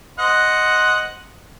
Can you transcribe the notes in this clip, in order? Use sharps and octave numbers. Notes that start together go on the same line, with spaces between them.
C5 D#5 F#5